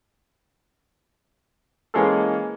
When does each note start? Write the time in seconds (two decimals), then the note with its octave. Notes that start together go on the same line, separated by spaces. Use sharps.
1.94 E3 G#3 A#3 C#4 G#4 A4